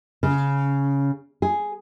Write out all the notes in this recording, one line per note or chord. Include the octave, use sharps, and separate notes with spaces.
C#3
G#4